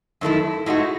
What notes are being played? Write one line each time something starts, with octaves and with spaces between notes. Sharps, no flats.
F#2 D#3 A3 E4
A2 G#3 D#4 F#4